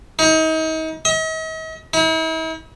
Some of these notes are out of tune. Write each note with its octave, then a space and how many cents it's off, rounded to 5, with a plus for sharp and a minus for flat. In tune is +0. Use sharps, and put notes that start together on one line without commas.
D#4 +35
D#5 +45
E4 -45